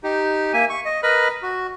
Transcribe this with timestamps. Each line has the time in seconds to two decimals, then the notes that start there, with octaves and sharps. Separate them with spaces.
0.03 D#4 G4
0.53 A#3 E5 G#5
0.69 C#6
0.85 D#5
1.03 A#4 B4 D#5 B5
1.43 F#4